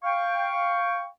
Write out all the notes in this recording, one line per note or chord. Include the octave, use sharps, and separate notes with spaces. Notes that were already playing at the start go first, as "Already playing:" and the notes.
F5 G5 C#6